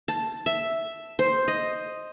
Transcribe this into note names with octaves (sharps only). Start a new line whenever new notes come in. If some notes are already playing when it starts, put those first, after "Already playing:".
A5
E5
C5
D#5